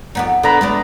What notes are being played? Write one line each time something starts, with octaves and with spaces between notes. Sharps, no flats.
F2 B3 D#4
D3 B3 A#5 B5
G#3 A3 D4